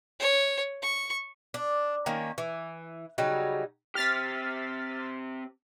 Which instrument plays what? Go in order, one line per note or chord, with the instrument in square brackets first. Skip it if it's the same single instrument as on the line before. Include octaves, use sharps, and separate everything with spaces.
[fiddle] C#5
C#6
[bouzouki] D4
D#3 A#3 C#4
E3
C#3 F#3 G3 D#4
[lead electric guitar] C4 G4 [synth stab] F6 A6 B6